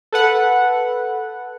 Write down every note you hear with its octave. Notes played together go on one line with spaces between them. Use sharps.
A4 B4 F#5